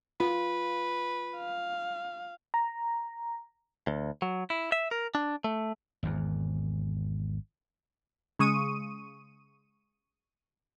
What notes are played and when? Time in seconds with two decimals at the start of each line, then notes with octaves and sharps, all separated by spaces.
0.20 F4 B4
1.38 F5
2.54 A#5
3.87 D2
4.22 F#3
4.50 E4
4.72 E5
4.91 A#4
5.15 D4
5.44 A3
6.03 G#1 E2
8.39 C#3 G#3 C#6 D#6 D#7